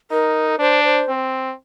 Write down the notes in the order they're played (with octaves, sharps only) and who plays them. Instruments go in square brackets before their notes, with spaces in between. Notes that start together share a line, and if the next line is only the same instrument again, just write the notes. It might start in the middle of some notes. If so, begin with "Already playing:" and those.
[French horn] D#4 [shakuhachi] A#4
[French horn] D4 [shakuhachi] C5
[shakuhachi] C5
[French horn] C4